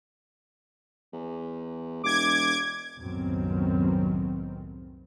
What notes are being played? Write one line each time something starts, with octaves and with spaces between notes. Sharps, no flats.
E2
E1 D6 G#6
C2 F#2 A2 D#3 B3 C4